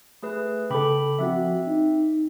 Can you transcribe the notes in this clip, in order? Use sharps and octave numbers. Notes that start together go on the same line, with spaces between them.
A3 G#4 B4
C#3 A4 G5 B5 D6
F3 C4 F#4 E5
D#4